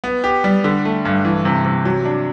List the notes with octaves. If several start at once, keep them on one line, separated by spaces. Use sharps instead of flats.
B3
G4
G3
D3
A3
G2
E3
C3
C3
F#3
D4